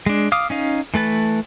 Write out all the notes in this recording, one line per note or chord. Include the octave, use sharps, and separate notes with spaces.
G#3 D4
F5 D6 D#6
C#4 D#4 F5
E3 A3 B4 A5